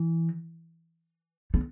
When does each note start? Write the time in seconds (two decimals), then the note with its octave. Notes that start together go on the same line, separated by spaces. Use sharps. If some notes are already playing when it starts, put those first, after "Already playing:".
Already playing: E3
1.54 B3